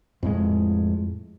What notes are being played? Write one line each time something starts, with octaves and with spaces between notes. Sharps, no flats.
F2 A2 G#3